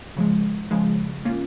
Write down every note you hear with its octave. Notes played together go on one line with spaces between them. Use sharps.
C#3 F3 G#3
C#3 F3 G#3
A#3 C#4 F4